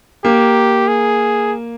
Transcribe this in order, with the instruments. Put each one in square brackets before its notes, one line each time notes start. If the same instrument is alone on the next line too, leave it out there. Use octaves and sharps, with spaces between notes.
[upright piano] A#3 [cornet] G4
[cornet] G#4